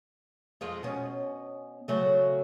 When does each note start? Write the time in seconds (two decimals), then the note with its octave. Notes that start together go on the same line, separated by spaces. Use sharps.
0.61 F2 G#3 F4
0.83 B2 C#4
1.88 C#3 F#3 A3